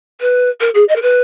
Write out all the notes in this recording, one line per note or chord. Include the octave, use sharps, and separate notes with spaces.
B4
A#4
G#4
D#5
A#4
B4